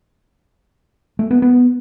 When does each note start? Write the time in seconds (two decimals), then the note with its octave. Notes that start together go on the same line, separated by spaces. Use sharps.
1.19 A3
1.31 B3
1.42 B3